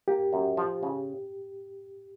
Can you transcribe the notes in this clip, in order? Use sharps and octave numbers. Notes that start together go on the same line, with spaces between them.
A#3 G4
F#2
F3
C#3